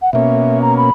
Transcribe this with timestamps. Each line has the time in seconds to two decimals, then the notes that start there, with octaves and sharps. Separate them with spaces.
0.02 F#5
0.13 B2 A#3 C#4 E5
0.61 A#5
0.77 B5